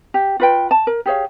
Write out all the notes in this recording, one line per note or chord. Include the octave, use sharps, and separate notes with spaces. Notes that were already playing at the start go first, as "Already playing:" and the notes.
G4
F4 B4 G5
A5
A#4
G4 G#4 C#5 F5